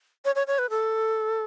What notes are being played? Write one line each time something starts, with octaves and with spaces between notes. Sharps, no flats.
C#5
C#5
C#5
B4
A4